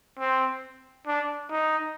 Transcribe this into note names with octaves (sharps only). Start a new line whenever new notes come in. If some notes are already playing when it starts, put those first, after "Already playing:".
C4
D4
D#4